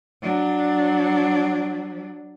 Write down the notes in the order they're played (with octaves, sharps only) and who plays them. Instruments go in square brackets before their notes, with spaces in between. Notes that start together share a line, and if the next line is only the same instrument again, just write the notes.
[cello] F#3 D4